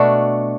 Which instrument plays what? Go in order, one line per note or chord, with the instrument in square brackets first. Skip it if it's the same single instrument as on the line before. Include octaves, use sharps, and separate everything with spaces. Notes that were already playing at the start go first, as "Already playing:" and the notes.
Already playing: [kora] B2 A3 D4 F#4